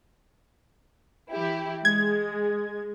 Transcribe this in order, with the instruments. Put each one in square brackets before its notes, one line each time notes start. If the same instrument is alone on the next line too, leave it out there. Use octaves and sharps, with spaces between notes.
[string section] E3 E4 G4
[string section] G#3 [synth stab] G#6